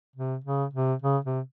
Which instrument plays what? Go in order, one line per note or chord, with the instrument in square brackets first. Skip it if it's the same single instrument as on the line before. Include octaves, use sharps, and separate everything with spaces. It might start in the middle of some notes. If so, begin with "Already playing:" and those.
[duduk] C3
C#3
C3
C#3
C3